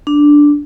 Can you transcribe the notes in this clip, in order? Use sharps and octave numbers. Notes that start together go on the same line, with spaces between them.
D4